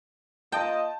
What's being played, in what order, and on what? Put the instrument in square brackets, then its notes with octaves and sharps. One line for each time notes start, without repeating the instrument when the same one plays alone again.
[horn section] A#3 F4 D#5 [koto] G5 [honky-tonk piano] A5